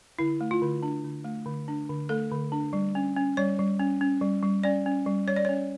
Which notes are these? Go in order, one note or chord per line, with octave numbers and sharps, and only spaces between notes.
D3 E4
A3
F4
D3
D4
D3
A3
D3
D4
D3
A3 A4
D3
D4
G3
C#4
C#4
G3 C#5
G3
C#4
C#4
G3
G3
C#4 D5
C#4
G3
G3 C#5
D5
C#4 C#5